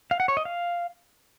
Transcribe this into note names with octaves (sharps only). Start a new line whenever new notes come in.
F5
F#5
C#5
D#5
F5